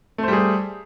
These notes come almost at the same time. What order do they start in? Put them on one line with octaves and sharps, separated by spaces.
A3 C5 G3 G#4